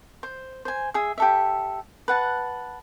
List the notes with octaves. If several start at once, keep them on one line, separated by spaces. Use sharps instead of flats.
C5
C5 G#5
G#4 E5
G4 A4 E5
B4 F#5 A5